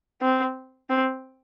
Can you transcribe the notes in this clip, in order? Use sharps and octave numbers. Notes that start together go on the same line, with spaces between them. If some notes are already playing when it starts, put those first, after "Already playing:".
C4
C4